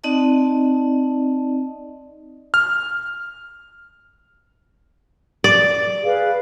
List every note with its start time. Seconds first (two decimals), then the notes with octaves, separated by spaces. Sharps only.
0.04 C4 D#4 D5 D#5 A5
2.54 F6
5.44 D5
6.04 G#4 B4 F5